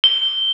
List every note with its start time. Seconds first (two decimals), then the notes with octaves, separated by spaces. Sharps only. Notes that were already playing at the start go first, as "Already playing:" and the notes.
0.04 G7